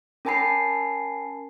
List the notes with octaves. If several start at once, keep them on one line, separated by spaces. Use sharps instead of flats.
C#4 A#4 G#5 A5 B5 C7